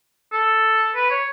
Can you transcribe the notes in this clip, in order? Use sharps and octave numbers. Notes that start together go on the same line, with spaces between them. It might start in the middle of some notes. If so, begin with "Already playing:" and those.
A4
B4
C#5